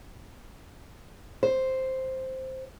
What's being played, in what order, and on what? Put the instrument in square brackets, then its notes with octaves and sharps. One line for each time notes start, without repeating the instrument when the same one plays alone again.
[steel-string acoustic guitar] C5